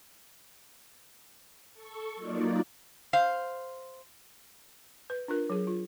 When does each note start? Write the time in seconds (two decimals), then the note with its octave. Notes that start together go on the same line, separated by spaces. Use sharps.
1.73 A4 C#6
2.16 F#3 A#3 D#4 F4 D5
3.13 C5 F5
5.10 B4
5.28 D4 F4 A#4
5.50 F#3 G#4
5.67 F4